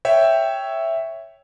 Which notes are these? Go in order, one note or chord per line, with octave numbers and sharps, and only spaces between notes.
C#5 E5 G5